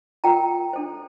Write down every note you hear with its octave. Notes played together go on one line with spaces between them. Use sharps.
F4 A#4 G5 A#5
D4 A4 C5